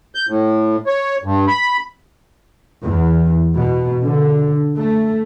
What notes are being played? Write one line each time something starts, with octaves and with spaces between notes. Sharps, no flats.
G6
A2
C#5
G2
B5
E2
B2
D3
A3